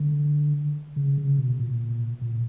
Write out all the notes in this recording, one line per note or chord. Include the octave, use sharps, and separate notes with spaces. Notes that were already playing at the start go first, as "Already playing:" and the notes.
Already playing: D3
C#3
C#3
B2
A#2
A#2